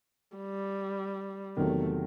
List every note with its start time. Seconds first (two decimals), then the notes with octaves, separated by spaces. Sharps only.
0.36 G3
1.56 E2 C3 D#3 F#3 A3 C4